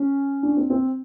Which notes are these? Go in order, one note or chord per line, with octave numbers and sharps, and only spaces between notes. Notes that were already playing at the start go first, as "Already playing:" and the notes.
Already playing: C#4
D4
C4
C4